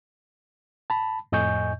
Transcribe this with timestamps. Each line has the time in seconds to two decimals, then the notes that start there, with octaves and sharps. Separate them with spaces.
0.90 A5 B5
1.32 F2 A2 D#5 G#5 C#6 G6